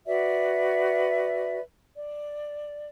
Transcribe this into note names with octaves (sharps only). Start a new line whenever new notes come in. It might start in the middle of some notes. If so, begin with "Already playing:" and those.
F#4 B4 D5 E5
D5